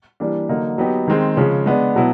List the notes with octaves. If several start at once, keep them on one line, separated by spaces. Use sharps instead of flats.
E3 G3 A#3 D4
D3 F#3 A#3 D#4
F#3 B3 D#4 G4
D#3 G#3 C4
C#3 F3 G#3
G#3 B3 D4
B2 F#3 B3 E4